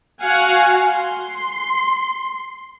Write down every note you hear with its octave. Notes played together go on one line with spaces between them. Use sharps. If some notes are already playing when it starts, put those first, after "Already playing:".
F#4 F5 F#5 G#5
C6